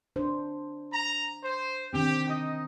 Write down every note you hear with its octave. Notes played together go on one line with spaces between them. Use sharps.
D4 C5
A#5
C5
D#3 C4 D4 G4
D#4 D#5